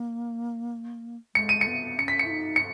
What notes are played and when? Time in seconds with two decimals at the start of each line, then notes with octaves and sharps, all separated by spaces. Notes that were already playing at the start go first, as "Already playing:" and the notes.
Already playing: A#3
1.35 G#3 C#7
1.49 D#7
1.61 C#7
1.67 B3
1.98 C#4 C#7
2.08 B6
2.19 C#7
2.25 E4
2.30 D#4
2.56 C#7